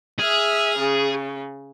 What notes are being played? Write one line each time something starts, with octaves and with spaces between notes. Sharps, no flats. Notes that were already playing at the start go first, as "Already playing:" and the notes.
G#4 E5 F6
C#3